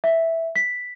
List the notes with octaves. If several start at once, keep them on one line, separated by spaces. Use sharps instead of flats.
E5
B6